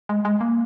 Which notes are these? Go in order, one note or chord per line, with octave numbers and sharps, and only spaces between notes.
G#3
G#3
A#3